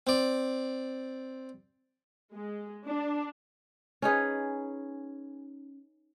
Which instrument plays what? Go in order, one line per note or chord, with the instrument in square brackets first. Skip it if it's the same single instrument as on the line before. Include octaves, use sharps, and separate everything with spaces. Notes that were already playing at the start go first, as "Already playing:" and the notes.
[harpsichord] C4 D5
[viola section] G#3
D4
[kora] C#4 D#4 G#4 B4